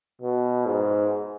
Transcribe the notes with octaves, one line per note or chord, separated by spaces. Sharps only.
B2
G#2